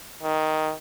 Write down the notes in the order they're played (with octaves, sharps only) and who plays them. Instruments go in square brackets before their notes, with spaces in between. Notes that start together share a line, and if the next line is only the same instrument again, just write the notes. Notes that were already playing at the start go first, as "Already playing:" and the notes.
[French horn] D#3